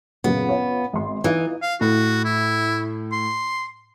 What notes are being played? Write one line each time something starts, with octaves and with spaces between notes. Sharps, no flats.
F#2 A#2 C#3 B3
C#4 F4 C#5
G#1 C6
E3 D#4 F4
F5
A2 F#4
E4
C6